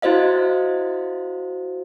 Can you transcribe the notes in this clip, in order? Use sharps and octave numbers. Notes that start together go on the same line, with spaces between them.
E4 F#4 C5 D#5 F5